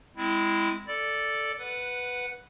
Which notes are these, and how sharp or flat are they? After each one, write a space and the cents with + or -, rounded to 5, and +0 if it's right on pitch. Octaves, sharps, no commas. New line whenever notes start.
G#3 -10 C4 -25 E4 +0
A4 +0 D5 -5
B4 +0 F#5 -10